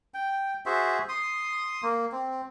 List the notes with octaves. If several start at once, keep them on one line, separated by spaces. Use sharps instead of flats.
G5
F#4 G#4 C5 E5
C6 D#6
A#3
C4